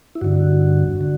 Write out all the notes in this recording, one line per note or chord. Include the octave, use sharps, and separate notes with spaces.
E4
G2 D3 F#4
D3